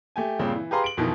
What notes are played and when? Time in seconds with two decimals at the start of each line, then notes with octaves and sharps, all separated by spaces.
0.16 A3 G4 G#5
0.39 G2 A#2 C#3 C4
0.56 E3
0.71 G4 G#4 B4 F5 A#5 C6
0.84 D7 F#7
0.97 F2 B2 D#3 E3